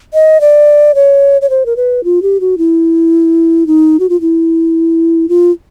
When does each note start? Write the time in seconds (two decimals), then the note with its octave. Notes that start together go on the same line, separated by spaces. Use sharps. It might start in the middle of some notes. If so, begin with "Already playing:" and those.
0.14 D#5
0.41 D5
0.95 C#5
1.42 C#5
1.50 C5
1.66 A#4
1.76 B4
2.04 F4
2.22 G4
2.40 F#4
2.58 E4
3.67 D#4
4.00 F#4
4.10 F4
4.21 E4
5.29 F4